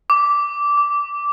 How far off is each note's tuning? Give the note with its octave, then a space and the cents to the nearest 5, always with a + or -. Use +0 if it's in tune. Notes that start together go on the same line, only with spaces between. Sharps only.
D6 -15
D6 -20